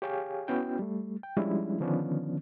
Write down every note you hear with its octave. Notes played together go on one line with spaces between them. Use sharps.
G4 G#4 C#5 F5 G5 G#5
B3 C#4 E4 F#4 G5
G3 A3
G5
F3 G3 G#3 C#4 D4 E4
D3 D#3 F3 B3 C#4 D4